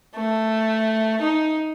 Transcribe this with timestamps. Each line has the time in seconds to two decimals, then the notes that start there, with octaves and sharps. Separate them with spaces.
0.16 A3
1.21 D#4